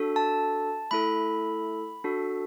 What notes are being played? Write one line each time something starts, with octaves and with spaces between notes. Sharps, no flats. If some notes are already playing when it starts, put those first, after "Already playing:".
Already playing: D4 F#4 A4
A5
A3 E4 A4 B5
D4 F#4 A4